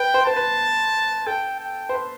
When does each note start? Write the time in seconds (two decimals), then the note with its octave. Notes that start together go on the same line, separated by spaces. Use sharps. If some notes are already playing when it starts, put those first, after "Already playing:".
Already playing: B4 G5
0.14 C5
0.25 C5 A5
0.36 B4
1.27 A4 G5
1.60 G5
1.89 C5
1.94 B4